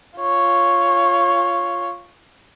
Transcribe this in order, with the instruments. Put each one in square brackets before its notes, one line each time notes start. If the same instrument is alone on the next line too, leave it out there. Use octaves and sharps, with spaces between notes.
[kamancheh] F4 C#5